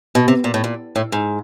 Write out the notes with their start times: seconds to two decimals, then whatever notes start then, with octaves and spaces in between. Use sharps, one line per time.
0.15 B2
0.28 C3
0.44 A#2
0.54 A2
0.64 A#2
0.96 A2
1.12 G#2